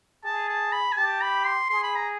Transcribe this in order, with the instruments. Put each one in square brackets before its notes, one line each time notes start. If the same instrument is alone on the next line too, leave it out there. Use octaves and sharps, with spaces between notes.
[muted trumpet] G#4 [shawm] A5
[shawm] A5
B5
G#5
[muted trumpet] G4 [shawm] A5
[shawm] B5
C6
[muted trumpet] G#4 [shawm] C6
[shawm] B5
A#5